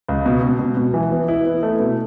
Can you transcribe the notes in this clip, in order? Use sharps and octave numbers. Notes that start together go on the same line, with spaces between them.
C#2
B2
B2
B2
B2
E3
B3
E4
B3
A3
B2